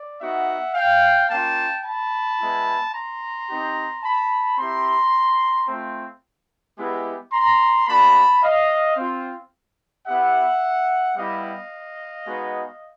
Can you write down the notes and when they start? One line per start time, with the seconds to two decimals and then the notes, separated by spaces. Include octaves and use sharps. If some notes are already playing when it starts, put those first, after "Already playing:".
Already playing: D5
0.19 B3 D#4 F#4 E5 F#5
0.74 F5 G5
1.29 A#3 C#4 F4 G5 A5
1.84 A5 B5
2.39 G#3 B3 E4
2.94 A#5 C6
3.48 C4 D#4 G4
4.03 A5 B5
4.58 C4 E4 G4 A#5 C6
5.67 A3 C4 F4
6.77 G#3 B3 E4 G4
7.32 A#5 C6
7.87 A#3 D4 F#4 A5 B5
8.42 D#5 F5
8.97 C4 F4
10.06 B3 E4 G4 E5 F#5
11.16 G3 B3 E4 G4 D#5 F5
12.26 G#3 B3 D#4 F#4